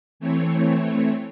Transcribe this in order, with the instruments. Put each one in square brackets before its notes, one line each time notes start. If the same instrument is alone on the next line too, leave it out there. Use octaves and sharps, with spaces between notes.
[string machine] E3 A3 C4 C#5